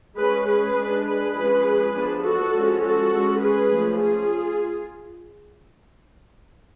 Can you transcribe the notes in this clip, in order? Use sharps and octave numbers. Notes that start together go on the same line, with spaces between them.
G#3 C#4 G#4 B4
G#4 B4
G#3 D4
G#4 B4
F3 G#3 C#4
F3 B3 D4
F#4 A4
F3 G#3 C#4
F#4 A4
G#3 C#4
G#4 B4
F3 A3 C#4
F4 G#4